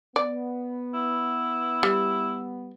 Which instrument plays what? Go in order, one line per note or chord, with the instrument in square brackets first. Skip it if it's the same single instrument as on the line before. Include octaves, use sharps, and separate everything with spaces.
[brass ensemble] B3 [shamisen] D5
[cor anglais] E4
[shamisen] G3